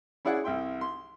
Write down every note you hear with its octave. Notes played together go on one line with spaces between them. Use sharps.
C#4 E4 G#4 D5 F#5
C2 E5 G5 C6
C6